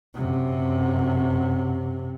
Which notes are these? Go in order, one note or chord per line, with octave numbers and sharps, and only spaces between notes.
F#2 C3